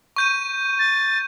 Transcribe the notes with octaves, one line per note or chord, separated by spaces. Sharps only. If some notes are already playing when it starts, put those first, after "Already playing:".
C#6 G6 D#7
A6